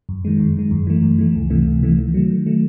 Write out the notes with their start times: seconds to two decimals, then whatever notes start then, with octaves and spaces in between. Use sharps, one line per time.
0.09 F#2
0.25 D#3 G#3
0.40 F#2
0.56 D#3 G#3
0.71 F#2
0.87 E3 A3
1.03 F#2
1.19 E3 A3
1.35 C#2
1.50 C3 E3 A3
1.67 C#2
1.83 C3 E3 A3
1.99 D#3
2.14 F#3 A3
2.30 D#3
2.46 F#3 A3